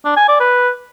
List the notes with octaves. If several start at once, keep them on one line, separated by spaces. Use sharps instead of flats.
D4
G#5
D5
B4